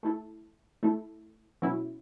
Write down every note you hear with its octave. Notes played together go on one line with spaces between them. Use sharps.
A3 E4 A4
A3 E4 A4
B2 F#3 C#4 E4